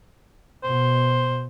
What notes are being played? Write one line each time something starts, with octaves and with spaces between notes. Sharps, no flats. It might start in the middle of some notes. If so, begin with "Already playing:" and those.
B2 C5